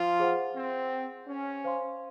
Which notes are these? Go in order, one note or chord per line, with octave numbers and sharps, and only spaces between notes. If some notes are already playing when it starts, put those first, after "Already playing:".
Already playing: F3 F4
G#4 C5 F#5
C4
C#4
C5 F5 C6